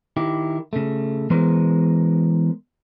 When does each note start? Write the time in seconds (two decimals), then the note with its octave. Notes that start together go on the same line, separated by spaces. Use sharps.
0.17 D#3 E4 G4
0.73 C#3 A3
1.30 E3 G#3 B3 A#4 C5